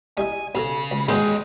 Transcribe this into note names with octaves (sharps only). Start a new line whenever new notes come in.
G3 D#4 E4 G#5
B1 C#3 A4 A#5
C#2
G2 D#3 E3 F#3 G#3 D#5 G5